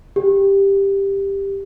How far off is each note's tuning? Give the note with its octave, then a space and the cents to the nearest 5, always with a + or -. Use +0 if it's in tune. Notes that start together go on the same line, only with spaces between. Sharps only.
G4 +10